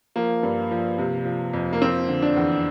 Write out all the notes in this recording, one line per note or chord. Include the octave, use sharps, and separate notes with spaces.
F3 A#3
G2
F3
C3
F3
F2
A#3
F3 C4
D3
D4
E2